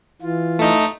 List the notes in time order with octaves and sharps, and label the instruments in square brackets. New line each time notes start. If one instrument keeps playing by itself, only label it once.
[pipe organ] E3 F4
[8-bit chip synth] A3 D#4